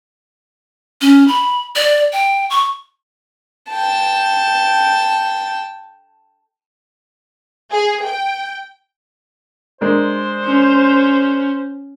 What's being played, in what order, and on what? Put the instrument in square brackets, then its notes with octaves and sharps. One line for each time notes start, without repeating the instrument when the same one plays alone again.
[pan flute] C#4
B5
D5
G5
C#6
[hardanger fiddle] G5 A5
[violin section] G#4
G5
[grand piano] G#3 D4 A#4 [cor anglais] C5
[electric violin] C#4